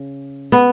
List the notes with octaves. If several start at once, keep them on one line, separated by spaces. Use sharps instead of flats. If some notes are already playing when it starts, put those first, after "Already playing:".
Already playing: C#3
B3